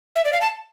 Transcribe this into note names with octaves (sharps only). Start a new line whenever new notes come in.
E5
D5
F5
A5